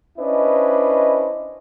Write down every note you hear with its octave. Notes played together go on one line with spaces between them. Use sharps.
C#4 D4 E4 B4 C5 D#5